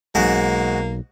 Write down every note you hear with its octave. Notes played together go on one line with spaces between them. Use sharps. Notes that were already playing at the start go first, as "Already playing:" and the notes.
B1 G#2 G#3 A#3 F#4